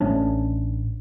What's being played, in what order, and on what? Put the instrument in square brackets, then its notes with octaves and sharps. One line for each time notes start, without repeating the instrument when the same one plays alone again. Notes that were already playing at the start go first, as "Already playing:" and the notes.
[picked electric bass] A1 A3 C#4 D4